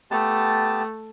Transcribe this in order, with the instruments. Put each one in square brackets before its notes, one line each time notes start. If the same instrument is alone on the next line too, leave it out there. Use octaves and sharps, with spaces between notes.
[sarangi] A3 [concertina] B3 G4 A5